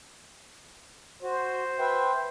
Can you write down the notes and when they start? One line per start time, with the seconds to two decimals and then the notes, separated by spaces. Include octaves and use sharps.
1.23 F#4 C5
1.79 B4 E5 G5